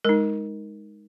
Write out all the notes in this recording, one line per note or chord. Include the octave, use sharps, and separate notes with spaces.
G#3 D#4 A#4